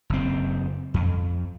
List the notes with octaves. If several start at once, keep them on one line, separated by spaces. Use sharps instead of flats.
F#1 C4
F2